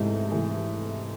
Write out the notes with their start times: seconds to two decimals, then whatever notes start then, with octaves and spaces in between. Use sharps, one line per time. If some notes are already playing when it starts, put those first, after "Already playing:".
Already playing: G#2 C3 E3 A3
0.31 C3 E3 A3